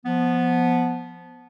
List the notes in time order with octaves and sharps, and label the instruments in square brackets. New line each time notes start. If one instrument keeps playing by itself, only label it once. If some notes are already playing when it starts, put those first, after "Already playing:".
[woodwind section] F3 B3